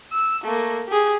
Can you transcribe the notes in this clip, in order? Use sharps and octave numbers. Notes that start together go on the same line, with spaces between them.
E6
A3 A#3
G4 G#4